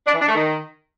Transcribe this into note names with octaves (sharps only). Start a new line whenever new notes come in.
D4
E3
D4
A3
D#3